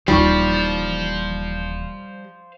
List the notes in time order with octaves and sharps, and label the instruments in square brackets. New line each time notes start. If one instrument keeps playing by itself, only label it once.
[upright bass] D#1 E3 [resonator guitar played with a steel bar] G3 [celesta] D#4 F4 C#6 [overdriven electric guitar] C5 F5